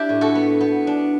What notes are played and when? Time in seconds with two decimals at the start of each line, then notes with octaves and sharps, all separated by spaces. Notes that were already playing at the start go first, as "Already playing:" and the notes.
Already playing: D4 E4 G4
0.09 A2
0.21 F#4 A4
0.35 B3
0.60 B3
0.87 D4